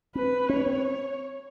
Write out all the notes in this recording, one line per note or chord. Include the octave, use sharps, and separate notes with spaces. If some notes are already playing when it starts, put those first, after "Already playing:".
C4 B4
C#4 C#5
C4